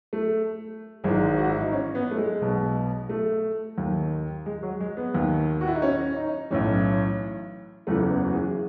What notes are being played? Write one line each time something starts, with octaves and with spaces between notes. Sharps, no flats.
A3
G#1 G#2 E3 G#3
F#4
E4
D#4
C#4
B3
A3
G#3
B1 B2
A3
D#2 D#3
G#3
F#3
G#3
B3
D#2 D#3
F#4
E4
D#4
C#4
D#4
B1 A2 E3 C#4
F#1 E2 C#3 E3 A3
B3
F#4
G#4